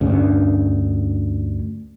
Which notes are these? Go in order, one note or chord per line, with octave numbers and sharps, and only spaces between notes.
D2 G2 C#4